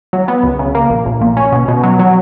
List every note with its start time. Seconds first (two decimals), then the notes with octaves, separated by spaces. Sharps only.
0.13 F#3
0.28 B3
0.43 C#2
0.59 C#3
0.75 A#3
0.90 A#1
1.06 A#1
1.21 A#2
1.37 C#4
1.52 B2
1.68 B2
1.83 F#3
1.99 F#3